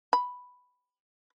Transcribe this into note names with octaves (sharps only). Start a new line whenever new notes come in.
B5